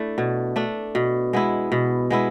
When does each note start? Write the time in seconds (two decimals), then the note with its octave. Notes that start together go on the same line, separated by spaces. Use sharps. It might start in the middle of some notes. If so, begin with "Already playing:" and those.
Already playing: A3 D4 E4
0.18 B2
0.56 A3 D4
0.95 B2
1.33 G#3 B3 E4
1.72 B2
2.10 G#3 B3 E4